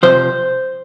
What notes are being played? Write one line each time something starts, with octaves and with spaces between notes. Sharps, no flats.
F2 C3 F3 C5